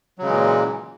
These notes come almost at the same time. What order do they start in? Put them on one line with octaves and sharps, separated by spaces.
F#3 C#3 G#3 E3 A#2